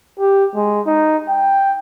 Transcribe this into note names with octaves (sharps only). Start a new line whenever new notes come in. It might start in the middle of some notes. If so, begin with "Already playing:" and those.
G4
G#3
D#4
G5